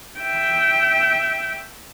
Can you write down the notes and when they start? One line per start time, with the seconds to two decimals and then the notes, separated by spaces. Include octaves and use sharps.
0.19 E5 G5